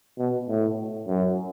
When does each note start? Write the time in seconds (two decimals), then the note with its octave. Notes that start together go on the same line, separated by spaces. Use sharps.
0.18 B2
0.49 A2
1.07 F#2